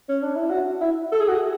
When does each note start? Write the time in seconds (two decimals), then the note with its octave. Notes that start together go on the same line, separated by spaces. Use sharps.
0.09 C#4
0.23 D4
0.36 E4
0.50 F#4
0.81 E4
1.12 A4
1.20 G#4
1.28 F#4
1.35 G#4